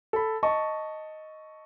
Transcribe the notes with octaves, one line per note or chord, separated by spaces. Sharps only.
A4 B5
D#5 A5 C#6